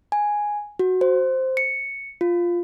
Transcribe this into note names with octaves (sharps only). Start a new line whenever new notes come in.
G#5
F#4
C5
C#7
F4